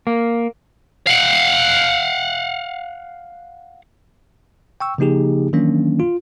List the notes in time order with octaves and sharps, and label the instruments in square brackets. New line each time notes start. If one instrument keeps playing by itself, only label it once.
[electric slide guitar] A#3
[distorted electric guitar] F5 F#5
[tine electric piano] G5 C#6 E6
C#3 F3 A#3 D#4 G4 G#4
D#3 E3 F#3 A#3 C#4 D4
F4